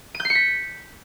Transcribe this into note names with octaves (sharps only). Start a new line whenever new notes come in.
D#7
G6
C7
C#7
B6